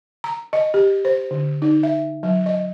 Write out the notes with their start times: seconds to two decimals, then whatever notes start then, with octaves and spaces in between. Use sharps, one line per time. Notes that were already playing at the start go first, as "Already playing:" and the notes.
0.24 A#5
0.53 D#5
0.74 G4
1.05 C5
1.31 D3
1.62 D#4
1.83 E5
2.23 F#3
2.46 D#5